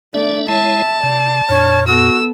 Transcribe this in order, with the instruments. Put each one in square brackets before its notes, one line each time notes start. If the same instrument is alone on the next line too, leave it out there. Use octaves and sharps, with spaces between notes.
[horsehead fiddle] A3 D5 [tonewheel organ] D4 E5
[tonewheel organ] G#3 E4 C#5 [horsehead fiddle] E5 [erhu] A5
[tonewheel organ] C3 [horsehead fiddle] D5
[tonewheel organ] F2 A#2 [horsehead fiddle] D4 [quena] C#5
[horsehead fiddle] B3 A4 [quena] F#4 [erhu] E6